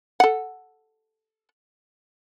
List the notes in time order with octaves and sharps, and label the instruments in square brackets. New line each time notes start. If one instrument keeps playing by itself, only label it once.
[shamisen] A4 F#5